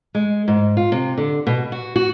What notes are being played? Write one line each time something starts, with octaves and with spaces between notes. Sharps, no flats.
G#3
G#2
F4
C3
D3
B2
F#4
F#4